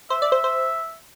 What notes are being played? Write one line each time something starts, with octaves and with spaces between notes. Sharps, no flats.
C5 E5
D5
C5
C5